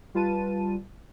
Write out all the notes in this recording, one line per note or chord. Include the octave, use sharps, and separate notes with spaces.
G3 F4 B4 A5 D#7